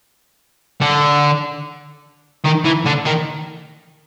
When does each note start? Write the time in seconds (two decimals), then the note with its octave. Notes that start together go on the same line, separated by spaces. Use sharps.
0.81 D3
2.44 D#3
2.64 E3
2.85 D3
3.05 D#3